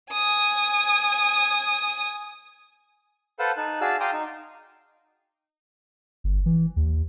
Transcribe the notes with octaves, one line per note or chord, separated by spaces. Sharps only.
G#5 D#6
A4 B4 C5 F5 F#5 A5
D#4 A5 F#6
F#4 G#4 D5 F5 A5 E6
F5 G5 A#5 C6 D6 D#6
D#4
G1
E3
D#2